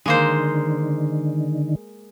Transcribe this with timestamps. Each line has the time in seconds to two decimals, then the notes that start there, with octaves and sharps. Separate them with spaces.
0.06 D3 D#3 G#3 A#3 C5